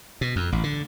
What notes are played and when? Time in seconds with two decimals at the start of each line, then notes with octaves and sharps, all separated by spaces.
0.21 B2
0.36 F2
0.52 A1
0.64 D3